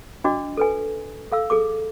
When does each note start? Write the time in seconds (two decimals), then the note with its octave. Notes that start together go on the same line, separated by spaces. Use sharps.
0.24 D4 F#4 D5 D#5 D6
0.57 A4 B4 G#5
1.32 A4 F5 E6
1.50 G#4 A4 D6